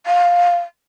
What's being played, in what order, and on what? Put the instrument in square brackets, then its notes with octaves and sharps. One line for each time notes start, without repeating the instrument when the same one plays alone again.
[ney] F5